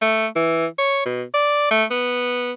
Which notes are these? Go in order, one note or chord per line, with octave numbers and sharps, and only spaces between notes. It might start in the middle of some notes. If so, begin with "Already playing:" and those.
A3
E3
C#5
B2
D5
A3
B3